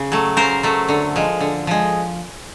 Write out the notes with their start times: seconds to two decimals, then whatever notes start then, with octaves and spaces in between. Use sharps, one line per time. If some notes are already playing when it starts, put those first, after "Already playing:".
Already playing: C#3
0.12 F#3 A3
0.37 C#3 A#4 C5
0.63 F#3 A3
0.89 D3
1.16 F3 G#3
1.40 D3
1.67 F3 G#3